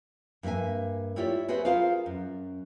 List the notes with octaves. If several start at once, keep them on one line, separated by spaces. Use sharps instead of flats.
G2 A#3 C#4 E5 G#5
E4 F4 G4 C#5 D5 E5
F#4 G#4 B4 C5 E5
F4 G#4 A#4 C5 F5
F#2